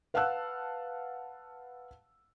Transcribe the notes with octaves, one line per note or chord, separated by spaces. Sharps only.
B4 F5 F#5 A5 E6 F#6